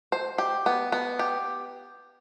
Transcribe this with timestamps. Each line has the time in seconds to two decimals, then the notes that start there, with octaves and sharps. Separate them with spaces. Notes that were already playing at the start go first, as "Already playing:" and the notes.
0.12 C5
0.38 G4
0.66 B3
0.92 B3
1.19 G4